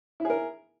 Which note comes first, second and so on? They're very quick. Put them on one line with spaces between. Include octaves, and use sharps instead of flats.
E4 G#4 A#4